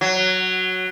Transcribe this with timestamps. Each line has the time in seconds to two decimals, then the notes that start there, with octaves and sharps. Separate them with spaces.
0.01 F#3